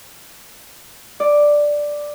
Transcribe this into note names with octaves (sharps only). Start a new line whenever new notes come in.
D5